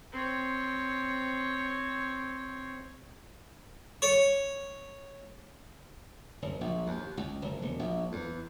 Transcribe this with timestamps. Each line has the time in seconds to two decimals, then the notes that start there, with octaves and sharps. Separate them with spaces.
0.12 C4 C#5
4.02 C#5
6.42 F#1
6.61 A#1
6.87 D#2
7.17 C#2
7.42 F#1
7.62 E1
7.79 A#1
8.12 E2